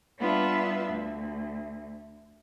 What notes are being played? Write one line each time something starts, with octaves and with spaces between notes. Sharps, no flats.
G3 B3 D4 F4 B4 E5
D2